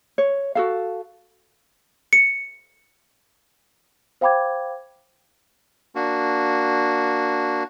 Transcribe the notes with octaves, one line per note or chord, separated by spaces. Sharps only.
C#5
F#4 A4 F5
C#7
C5 F5 G5 B5 D6 G#6
A#3 D4 F#4